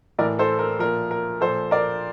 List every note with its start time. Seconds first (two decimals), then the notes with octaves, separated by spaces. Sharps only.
0.19 A2 E3 A#4 D5
0.39 A4 C5
0.59 A#4
0.79 A#2 F3 A#4
1.11 A#4
1.41 A#2 F3 A4 C5
1.71 A#4 D5